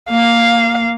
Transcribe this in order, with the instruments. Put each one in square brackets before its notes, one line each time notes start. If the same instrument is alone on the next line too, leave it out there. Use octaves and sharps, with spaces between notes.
[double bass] A#3 [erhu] F5